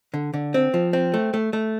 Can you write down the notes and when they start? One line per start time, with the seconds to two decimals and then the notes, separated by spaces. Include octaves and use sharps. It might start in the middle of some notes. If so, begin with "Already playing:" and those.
0.14 D3
0.34 D3
0.54 C4
0.74 F3
0.93 C4
1.14 A3
1.34 A3
1.53 A3